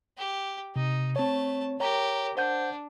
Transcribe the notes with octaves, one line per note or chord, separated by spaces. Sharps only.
G4
C3 D#4
A3 C4 C#5 A5
G4 A#4 C#5 A#5
D4 C5 F#5 G6